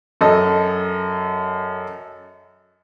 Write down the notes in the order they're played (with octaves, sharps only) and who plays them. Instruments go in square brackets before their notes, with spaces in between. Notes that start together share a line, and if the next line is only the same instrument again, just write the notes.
[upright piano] F#2 A4 D#5